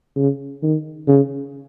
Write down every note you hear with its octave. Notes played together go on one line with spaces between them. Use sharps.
C#3
D#3
C#3